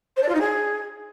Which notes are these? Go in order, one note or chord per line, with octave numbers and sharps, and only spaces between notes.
C5
D5
F4
D#4
G#4